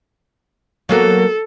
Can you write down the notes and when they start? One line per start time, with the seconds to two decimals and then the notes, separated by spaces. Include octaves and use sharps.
0.89 F#3 A#3 B3 A4